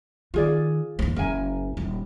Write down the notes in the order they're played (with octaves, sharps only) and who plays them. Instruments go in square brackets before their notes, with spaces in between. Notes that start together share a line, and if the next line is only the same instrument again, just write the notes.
[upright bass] D#3 [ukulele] F4 G#4 D5
[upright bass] E2 A#3
[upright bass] F#1 [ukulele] A#4 E5 G#5
[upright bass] D#1